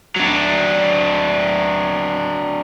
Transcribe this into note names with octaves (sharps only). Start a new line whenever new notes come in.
F#3 D4